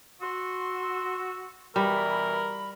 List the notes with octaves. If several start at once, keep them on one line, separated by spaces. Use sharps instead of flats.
F#4 C6 E6
B2 E3 G3 A#4 B5